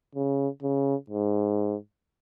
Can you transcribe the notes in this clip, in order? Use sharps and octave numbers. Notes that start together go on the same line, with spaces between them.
C#3
C#3
G#2